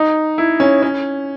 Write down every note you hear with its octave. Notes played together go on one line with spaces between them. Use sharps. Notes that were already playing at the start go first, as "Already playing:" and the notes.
Already playing: D#4
E4
C#4
C#4